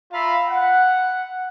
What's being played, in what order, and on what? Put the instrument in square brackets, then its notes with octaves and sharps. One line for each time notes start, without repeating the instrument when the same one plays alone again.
[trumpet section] F4 E5 F5 A#5 B5
F#5